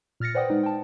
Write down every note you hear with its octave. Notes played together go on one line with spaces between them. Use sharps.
A#2 F6 A6 A#6 C#7
B4 C5 D5 F#5 G5 D#6
G#3 D#4 B4 C5
G5 A5